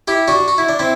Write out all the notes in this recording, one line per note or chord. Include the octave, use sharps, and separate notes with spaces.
E4 G4
D4 F#4
F#4
E4
D4
C4 E4